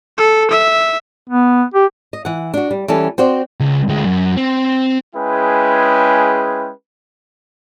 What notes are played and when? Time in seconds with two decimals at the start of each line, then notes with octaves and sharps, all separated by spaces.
0.18 A4
0.51 E5
1.29 B3
1.74 G4
2.13 D#5
2.25 E3 F#5
2.54 D4 F#4
2.71 G3
2.88 E3 G3 C#4 A4
3.18 C4 F#4 C5 D5
3.60 C#2
3.89 D2 G#3
4.05 F#2
4.37 C4
5.15 G#3 C#4 E4 G#4 B4 G5